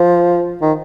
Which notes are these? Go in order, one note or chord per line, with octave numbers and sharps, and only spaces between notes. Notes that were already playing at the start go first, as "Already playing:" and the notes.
Already playing: F3
D#3